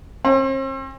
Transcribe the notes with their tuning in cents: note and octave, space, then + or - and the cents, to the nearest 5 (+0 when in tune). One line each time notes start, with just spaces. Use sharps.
C4 +45